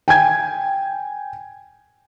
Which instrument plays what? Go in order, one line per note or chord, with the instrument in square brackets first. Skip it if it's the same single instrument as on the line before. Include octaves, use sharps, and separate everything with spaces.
[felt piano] G5 G#5 G#6